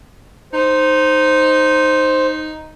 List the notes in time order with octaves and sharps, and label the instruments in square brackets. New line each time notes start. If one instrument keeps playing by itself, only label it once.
[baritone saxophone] D#4 [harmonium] C5